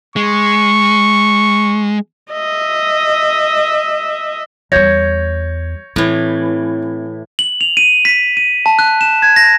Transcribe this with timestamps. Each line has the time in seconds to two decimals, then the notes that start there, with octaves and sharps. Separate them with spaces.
0.16 G#3 C#6
2.32 D#5 E5
4.72 E2 G3 C#5 G6 G#6 A#6
5.96 A2 E3 C4
7.39 F#7
7.61 F7
7.77 D#7
8.05 B6
8.37 D#7
8.66 A5
8.79 F#6
9.01 E7
9.22 G#6
9.36 A#6